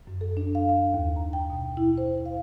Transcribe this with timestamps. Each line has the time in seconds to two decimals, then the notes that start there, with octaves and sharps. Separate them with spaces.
0.07 F#2
0.21 A4
0.37 D4
0.55 F5
0.69 F5
0.94 D#2
1.16 A#5
1.33 G5
1.50 B2
1.77 E4
1.98 C5
2.26 F5